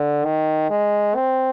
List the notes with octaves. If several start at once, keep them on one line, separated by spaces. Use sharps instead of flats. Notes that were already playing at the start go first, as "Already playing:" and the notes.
Already playing: D3
D#3
G#3
C4